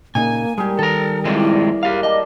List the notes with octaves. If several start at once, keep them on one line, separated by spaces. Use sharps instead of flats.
A#2 C#3 A#3 D#4 G#5
G3 G#3 G4 G#4 A#4
D#3 A4 A#5
E3 F3 G#3 C4 D5
A#3 G4 F5
G3 G4 D#5 A5